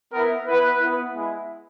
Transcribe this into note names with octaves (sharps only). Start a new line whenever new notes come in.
B3 E4 A#4
B3 E4 B4
B3 E4
G#3 B3 E4